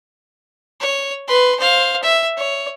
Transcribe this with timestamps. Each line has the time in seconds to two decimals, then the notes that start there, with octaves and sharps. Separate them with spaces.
0.80 C#5
1.28 B4 C6
1.59 C5 F5
2.03 E5
2.37 C#5